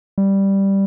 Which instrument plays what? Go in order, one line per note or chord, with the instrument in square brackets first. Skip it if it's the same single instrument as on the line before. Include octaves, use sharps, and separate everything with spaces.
[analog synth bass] G3